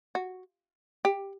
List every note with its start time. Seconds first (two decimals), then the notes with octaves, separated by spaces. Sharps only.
0.15 F#4
1.05 G4